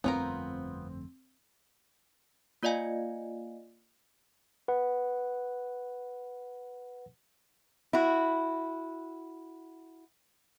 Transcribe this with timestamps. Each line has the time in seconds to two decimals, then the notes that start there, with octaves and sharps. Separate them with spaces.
0.04 G1 F2 A3 B3 C4 F4 A#4
2.63 A#3 F4 D5 D#5 F5 G#5
4.68 B4 F#5
7.93 E4 F#4